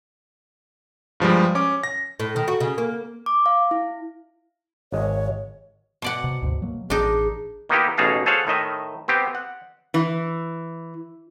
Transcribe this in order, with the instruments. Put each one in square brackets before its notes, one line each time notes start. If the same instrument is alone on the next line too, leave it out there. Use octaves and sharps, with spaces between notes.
[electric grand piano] G2 F3 G3 G#3
C#4 D6
A#6
[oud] A2
D#3
F#4
C#3
A#3
[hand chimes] D6
F5
E4
[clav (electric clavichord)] G#1 G#3 [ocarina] C#5
[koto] B2 D5 F#5
[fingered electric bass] C3
D2 G#2 C3
F#3 A#3
[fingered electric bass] A1 [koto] D4 D#4 [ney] G#4
[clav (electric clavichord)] D#3 A#3 B3 D#4 E4 G4
A1 B2 D#4 G#4 F5 A5
G#4 A4 C5 C#5 F5 F#5
A2 D#3 D#5 E5
B3 C4 G4
F#5
[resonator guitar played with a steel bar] E3